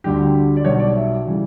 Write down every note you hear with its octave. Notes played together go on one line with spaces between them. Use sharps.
D2 D3 G3 G4
D5
B1 B2 G3 C#5
D5
E5
C#3 E3 G3